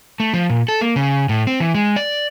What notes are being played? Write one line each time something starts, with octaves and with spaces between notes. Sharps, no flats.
A3
F3
A#2
A4
A#3
C#3
A2
C4
E3
G#3
D5